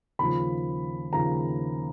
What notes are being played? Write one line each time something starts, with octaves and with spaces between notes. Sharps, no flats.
D#2 C#3 F3 B5
D#2 C#3 F3 A#5